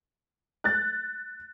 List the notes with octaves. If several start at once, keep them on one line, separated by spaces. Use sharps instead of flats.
F#6 A6